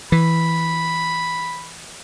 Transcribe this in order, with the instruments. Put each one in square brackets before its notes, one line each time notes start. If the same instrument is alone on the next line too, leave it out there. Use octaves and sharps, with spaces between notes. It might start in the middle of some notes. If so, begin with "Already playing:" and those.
[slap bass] E3 [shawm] B5